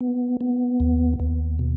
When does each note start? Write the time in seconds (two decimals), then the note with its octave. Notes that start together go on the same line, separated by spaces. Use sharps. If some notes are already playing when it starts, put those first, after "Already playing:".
0.01 B3
0.41 B3
0.80 D#2
1.20 D#2
1.59 B2